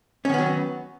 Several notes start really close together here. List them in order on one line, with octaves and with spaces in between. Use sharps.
C#4 D#3 B3 F#3